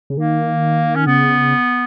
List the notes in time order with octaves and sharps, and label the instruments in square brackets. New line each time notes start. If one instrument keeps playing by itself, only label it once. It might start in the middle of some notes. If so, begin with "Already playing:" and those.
[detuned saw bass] C#3
[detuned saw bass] D#3 [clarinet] A#3
[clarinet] C#4
[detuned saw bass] C#3 [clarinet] B3